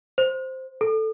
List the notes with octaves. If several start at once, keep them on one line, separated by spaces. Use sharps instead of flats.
C5
A4